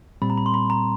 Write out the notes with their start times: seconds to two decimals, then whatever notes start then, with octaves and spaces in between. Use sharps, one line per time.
0.22 A#2 G3 C4 B5
0.30 A#5
0.38 B5
0.46 C6
0.54 B5
0.70 A#5